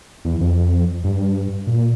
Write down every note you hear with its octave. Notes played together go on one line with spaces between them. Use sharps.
E2
F2
G2
A#2